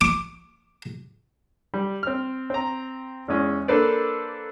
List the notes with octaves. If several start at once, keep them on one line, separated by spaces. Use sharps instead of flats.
D6
G3
C4 F6
C4 A#5
E2 E3 G#3 C#4
A#3 D4 A4 B4 C5 D5